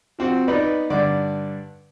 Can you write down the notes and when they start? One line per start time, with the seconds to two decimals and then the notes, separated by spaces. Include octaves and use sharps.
0.19 F3 C4 F#4
0.48 B3 D#4 B4 D5
0.90 G2 D3 D5 D6